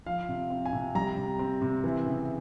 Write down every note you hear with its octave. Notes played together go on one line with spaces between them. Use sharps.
F3 F5
C3
C4
G#5
C3
G3 A#5
C3
C4
C3
E3
C#3